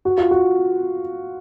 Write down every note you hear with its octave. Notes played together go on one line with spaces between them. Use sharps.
F#4
F4
F#4